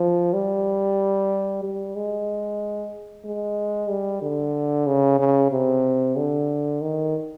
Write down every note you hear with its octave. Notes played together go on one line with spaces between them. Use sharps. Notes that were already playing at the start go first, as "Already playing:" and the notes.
Already playing: F3
G3
G3
G#3
G#3
G3
D3
C#3
C#3
C3
D3
D#3